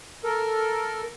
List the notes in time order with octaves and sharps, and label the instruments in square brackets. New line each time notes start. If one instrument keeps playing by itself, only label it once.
[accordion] A4 A#4